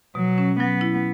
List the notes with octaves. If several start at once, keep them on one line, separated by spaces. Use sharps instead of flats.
B2 F#3
C#4
F#3 B3
E4